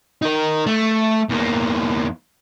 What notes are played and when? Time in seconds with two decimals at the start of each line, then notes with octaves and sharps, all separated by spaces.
0.22 D#4 A#4
0.66 A3
1.29 E2 A#3